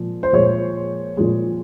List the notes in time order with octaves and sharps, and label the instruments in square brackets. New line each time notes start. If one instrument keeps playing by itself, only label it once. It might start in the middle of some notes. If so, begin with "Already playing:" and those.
Already playing: [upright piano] A#2 F3 G#3
C5
A#2 F3 G#3 C#5
A#2 F3 G#3